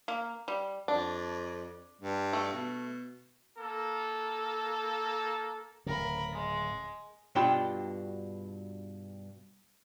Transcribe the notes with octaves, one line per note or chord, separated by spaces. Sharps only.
A#3
G3
F2 D4
G2
A3
B2
A#3 A4
D1 C#3 A#4 B5
G#3
G2 B2 D4 F4 G5 B5